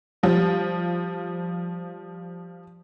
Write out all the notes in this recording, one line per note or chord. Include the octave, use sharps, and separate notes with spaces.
F3 G3